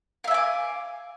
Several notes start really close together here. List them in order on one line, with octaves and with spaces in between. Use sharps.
F5 E5 G#5 D6